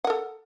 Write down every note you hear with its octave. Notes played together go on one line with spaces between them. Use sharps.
A4 A#4 F#5